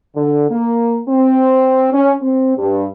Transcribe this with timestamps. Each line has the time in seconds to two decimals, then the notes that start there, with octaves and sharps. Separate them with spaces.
0.15 D3
0.50 A#3
1.08 C4
1.92 C#4
2.22 C4
2.57 G2